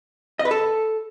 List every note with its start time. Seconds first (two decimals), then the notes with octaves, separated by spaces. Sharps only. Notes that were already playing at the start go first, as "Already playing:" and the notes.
0.39 D#5
0.45 B4
0.51 A4